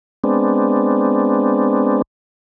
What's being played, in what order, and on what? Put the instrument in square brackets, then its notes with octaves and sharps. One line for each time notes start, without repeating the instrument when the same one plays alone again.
[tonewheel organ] G#3 B3 C4 D4